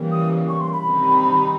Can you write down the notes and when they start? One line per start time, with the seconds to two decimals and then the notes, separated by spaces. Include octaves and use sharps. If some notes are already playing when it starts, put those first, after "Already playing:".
Already playing: C#3 E3 G3 A#3
0.11 D#6
0.48 C#6
0.60 C6
0.72 B5
0.85 C3 D#3 G3 C4 D#4